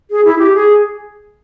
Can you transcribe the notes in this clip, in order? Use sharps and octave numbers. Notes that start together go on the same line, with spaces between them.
G#4
E4
G4
G#4